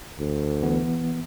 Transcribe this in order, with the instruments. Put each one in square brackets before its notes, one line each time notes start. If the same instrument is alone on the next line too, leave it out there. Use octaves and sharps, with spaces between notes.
[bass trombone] D2
[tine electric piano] E3 B3